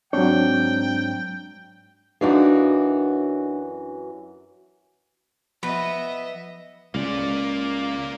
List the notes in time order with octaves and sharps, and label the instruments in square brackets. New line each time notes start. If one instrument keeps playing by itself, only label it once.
[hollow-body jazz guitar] G#2 C4 C#5 [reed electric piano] F#3 D4 [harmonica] G5
[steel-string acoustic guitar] F#2 E3 F#4 [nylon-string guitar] D4 D#4 F5
[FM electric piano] F3 [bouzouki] B3 [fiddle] D#5 E5
[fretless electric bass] C#2 [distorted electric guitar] A#3 D5